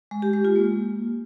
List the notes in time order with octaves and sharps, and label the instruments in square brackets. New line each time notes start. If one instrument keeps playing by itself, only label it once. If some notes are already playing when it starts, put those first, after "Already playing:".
[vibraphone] G#3
G4
G#3
F4
A#3